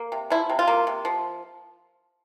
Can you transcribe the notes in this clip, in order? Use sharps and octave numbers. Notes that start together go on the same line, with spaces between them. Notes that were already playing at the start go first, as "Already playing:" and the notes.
Already playing: A#3
C3
F3 E4
C3
F4
A#3
C3
F3